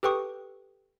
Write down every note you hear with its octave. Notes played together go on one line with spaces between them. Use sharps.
G4 A4 B4 G5 C#6 D#6